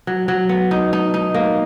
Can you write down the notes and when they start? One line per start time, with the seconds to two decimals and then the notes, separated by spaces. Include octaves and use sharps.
0.07 F#3
0.28 F#3
0.49 B3
0.71 D#4
0.93 D#4
1.14 D#4
1.34 A#3